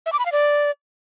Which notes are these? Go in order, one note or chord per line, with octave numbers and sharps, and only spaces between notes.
E5
D6
B5
F5
D5